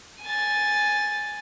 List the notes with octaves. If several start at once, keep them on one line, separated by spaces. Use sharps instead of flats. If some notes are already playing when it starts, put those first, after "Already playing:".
G#5 A6